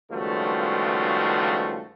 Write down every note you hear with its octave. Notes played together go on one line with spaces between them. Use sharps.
C#2 G2 D#3 F3 A3 F#4